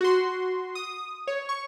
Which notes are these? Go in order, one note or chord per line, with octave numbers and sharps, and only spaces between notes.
F#4 C6
D#6
C#5
C#6